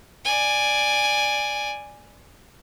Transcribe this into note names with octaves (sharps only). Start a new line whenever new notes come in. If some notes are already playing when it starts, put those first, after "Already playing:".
D5 G#5